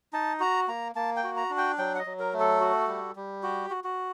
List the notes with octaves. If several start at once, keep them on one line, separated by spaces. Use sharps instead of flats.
D#4 A5
F#4 A#5
A#3 A#5
A#3 A5
G5
F#4
A#5
D4
G5
F#3 G5
F#5
D#5
F#3
A#4
A3
A4
F#4
G3
G3
F#4 G4
F#4
F#4